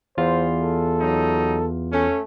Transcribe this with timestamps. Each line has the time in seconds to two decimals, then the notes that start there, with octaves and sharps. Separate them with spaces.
0.18 E2 F4 C5
0.61 A4
1.00 F#3 D#4
1.91 A3 C#4